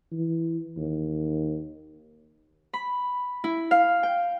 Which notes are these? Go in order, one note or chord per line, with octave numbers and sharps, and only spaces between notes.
E3
D#2
B5
E4
F5
G5